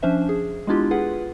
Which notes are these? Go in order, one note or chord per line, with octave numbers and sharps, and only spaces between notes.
F3 C#4 D4 C5 E5
G#4
G#3 B3 D4 E4 F4 G4
F4 G#4 B4 F#5